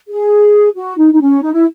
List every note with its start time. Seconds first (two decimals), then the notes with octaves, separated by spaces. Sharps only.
0.09 G#4
0.75 F#4
0.98 D#4
1.13 D#4
1.21 C#4
1.42 D#4
1.53 E4